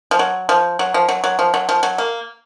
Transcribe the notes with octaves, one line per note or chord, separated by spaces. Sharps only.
F3
F#3
F3
F#3
F3
F#3
F#3
F3
F#3
F3
F#3
A#3